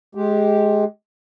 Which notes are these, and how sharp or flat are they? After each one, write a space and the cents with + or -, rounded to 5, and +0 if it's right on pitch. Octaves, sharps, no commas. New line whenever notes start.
G#3 +20 G4 +0